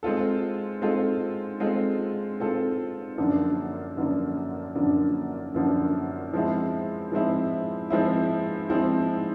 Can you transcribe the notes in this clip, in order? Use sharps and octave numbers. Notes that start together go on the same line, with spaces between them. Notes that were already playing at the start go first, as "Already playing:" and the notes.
G#3 C4 F4 A4
G#3 C4 F4 A4
G#3 C4 F4 A4
G#3 C4 F4 A4
F#2 D3 F3 A#3 D4
F#2 D3 F3 A#3 D4
F#2 D3 F3 A#3 D4
F#2 D3 F3 A#3 D4
F3 G#3 C4 E4
F3 G#3 C4 E4
F3 G#3 C4 E4
F3 G#3 C4 E4